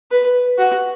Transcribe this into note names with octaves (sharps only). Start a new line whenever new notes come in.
B4
F#4